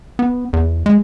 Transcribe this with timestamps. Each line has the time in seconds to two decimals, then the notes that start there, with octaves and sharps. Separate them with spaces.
0.19 B3
0.53 E2
0.86 G#3